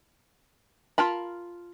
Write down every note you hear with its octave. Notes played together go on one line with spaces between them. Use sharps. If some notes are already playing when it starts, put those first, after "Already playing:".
F4 A#4 A5 B5